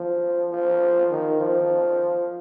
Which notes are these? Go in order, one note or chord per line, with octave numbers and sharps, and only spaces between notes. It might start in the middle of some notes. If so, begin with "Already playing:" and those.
Already playing: F3
F3
D#3
F3